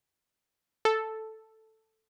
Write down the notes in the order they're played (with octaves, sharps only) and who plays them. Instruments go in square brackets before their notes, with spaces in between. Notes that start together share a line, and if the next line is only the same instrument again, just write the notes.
[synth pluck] A4